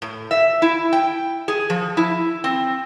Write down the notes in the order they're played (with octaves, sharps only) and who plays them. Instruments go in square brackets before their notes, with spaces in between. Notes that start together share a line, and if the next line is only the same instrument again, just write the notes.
[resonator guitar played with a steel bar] A2
E5
E4
G5
G#4
F3
E4
C4